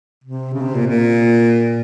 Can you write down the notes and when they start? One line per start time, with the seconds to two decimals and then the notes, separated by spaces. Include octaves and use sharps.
0.24 C3
0.53 C#3
0.62 C3
0.75 A#2
0.87 A#2